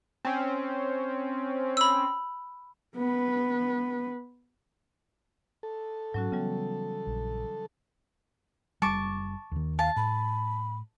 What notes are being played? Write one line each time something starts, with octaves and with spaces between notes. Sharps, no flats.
C4 C#4
B5 E6
B3 B4
A4
G#2 F#3 C#4 F#4
C#3 E3 G3 B3
A#1
F#1 G3 A5 C#6 D6
D#2 D#3
F5 A5
A2 B5